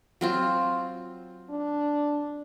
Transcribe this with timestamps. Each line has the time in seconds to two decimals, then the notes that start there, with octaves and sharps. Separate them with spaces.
0.21 F#3 C4 F4
1.50 D4